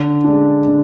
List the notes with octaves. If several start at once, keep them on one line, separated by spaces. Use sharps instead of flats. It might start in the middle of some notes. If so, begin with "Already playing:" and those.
Already playing: D3
G#3 D4
D3